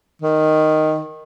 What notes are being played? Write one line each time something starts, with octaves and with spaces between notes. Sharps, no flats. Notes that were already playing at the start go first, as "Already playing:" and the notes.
D#3